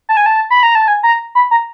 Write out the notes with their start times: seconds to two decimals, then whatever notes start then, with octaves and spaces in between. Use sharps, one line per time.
0.09 A5
0.17 G#5
0.26 A5
0.51 B5
0.63 A#5
0.75 A5
0.88 G#5
1.03 A#5
1.35 B5
1.51 A#5